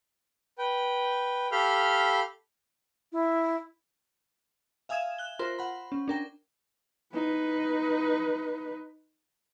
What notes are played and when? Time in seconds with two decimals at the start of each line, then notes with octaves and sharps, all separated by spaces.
0.58 B4 G5
1.52 G4 A4 F5 B5 F6 G6
3.13 E4
4.89 E5 F5 G#5 D#6 G#6 E7
5.18 F#6 G7
5.39 F4 A#4 C5 C6
5.59 F#5 B5
5.92 C#4
6.08 D4 A#4 G5
7.14 D#4 B4